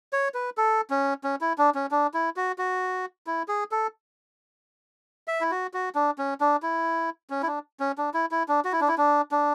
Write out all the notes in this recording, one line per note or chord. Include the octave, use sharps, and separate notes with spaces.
C#5
B4
A4
C#4
C#4
E4
D4
C#4
D4
E4
F#4
F#4
E4
G#4
A4
E5
E4
F#4
F#4
D4
C#4
D4
E4
C#4
E4
D4
C#4
D4
E4
E4
D4
F#4
E4
D4
E4
D4
D4